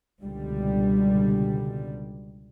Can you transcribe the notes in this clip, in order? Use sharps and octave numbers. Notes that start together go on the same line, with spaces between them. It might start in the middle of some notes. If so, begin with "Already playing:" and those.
C#2 B2 D3 G3